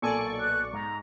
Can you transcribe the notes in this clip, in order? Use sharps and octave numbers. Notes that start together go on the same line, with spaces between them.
B1 A#2 A4 D5 G#5 C#6
F#6
G#2 A#5